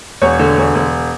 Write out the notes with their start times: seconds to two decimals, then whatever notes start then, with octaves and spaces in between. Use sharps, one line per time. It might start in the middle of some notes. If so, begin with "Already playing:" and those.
0.22 E1 C#5
0.39 D3
0.57 E1
0.75 E1